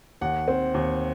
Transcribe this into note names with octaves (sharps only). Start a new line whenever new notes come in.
D#2 F#5
C4
D#2